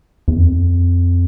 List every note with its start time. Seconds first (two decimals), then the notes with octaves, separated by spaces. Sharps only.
0.28 E2
0.36 F2